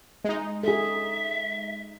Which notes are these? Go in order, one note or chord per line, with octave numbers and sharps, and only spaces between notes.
G#3 D#4
G#4 A4 E5